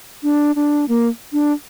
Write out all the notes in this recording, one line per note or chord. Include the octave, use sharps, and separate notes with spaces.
D4
D4
A#3
D4